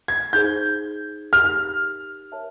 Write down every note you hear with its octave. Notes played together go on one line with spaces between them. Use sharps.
G#6
D#4 G#4 C5 G6
D#4 G4 A#4 F6
A#4 C#5 E5 A5